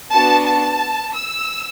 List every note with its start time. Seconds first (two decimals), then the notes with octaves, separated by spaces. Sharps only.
0.12 B3 D4 F#4 A5
0.46 A5
1.14 E6